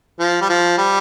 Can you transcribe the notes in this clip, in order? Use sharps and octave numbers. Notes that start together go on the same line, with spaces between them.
F3
G3
F3
G3